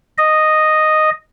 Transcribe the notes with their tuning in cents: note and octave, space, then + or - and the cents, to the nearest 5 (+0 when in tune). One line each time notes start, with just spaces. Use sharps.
D#5 -5